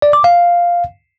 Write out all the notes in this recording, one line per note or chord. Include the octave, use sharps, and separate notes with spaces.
D5
D6
F5